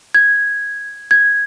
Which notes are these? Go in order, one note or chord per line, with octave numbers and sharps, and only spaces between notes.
G#6
G#6